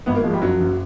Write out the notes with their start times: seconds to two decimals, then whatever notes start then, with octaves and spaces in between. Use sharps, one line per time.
0.06 G#1 B3
0.15 A#3
0.24 F3 G#3
0.33 G3
0.42 F#2 F#3
0.60 F#1